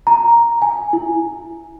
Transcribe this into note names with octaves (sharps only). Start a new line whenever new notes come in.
A#5
G#5
E4